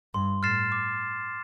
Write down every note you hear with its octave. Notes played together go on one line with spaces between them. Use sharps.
G2 C6
A2 F6 A6 C7 E7
D6